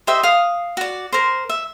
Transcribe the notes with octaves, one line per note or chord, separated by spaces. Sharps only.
G4 C5 D#5 E5
F5 D#6
F#4 D5
A#4 C5
E5